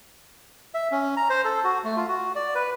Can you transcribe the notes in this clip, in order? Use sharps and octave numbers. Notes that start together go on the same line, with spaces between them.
E5
C#4
A#5
C5
A4
F#4
A3
F4
F#4
D5
B4